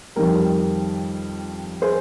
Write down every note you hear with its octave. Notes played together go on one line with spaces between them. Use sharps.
F2 D#3 G3 A#4
G#4 C5